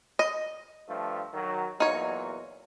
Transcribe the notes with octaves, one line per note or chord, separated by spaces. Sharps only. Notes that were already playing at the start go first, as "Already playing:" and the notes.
D#5
G2 F3 A3
D#3 F#3
E2 A#2 F#3 D#4 C#5